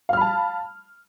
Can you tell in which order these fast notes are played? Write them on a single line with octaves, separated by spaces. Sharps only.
F5 F6 B5 A5